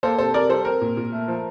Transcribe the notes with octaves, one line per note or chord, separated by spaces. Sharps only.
A#3 A4 C5
C3 A4 C5
C3 A#4 D5
G3 A4 C5
C4 A#4
A#2
A#2
A3
F3